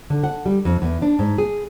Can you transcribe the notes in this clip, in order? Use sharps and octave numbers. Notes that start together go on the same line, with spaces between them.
D3
F#5
G3
F2
E2
D4
G#2
G#4